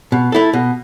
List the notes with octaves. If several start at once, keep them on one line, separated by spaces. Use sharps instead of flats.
B2
A3 E4 A4
B2